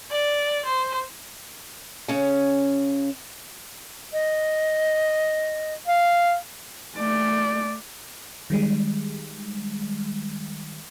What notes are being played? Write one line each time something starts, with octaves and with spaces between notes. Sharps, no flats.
D5
C5
C#3 C#4
D#5
F5
A3 D5
D#3 G3 G#3